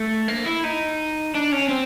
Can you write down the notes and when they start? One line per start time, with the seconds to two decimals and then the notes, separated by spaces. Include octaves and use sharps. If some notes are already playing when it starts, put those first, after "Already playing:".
Already playing: A3
0.28 A#3
0.46 E4
0.64 D#4
1.34 D4
1.52 C#4
1.69 C4